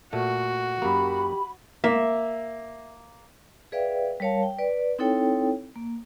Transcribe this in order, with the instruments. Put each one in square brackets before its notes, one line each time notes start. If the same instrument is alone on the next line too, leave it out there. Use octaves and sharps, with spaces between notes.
[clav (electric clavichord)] A#2 A3 [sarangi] F#4
[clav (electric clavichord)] F#2 A#3 [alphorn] G4 [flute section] B5
[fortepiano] A#3 [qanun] E5
[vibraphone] G#4 B4 D5 E5 F5 G5
G3 A#4 C#5 F5 A5
G5
B4 D5
C4 D#4 E4 A4 C#5 G5
A#3